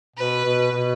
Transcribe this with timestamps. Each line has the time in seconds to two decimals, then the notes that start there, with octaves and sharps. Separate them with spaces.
0.16 B2 B4
0.45 B2
0.72 B2